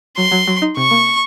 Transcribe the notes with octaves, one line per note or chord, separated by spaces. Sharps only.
F#3 C6
F#3
F#3
D#4
C3 C#6
A#3